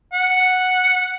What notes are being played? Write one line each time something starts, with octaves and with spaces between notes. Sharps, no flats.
F#5